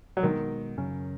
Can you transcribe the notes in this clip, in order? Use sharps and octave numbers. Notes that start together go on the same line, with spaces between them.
F#3
B2 D#3 G#3 B3
F#2 C#3 F#3 C#4